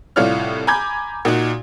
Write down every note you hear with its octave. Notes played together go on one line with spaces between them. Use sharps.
C2 A2 F4 C#5 D5 F6
G#5 A#5 B5 D6 G6 G#6
A#2 D#4 F#4